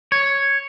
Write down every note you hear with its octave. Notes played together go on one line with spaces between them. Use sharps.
C#5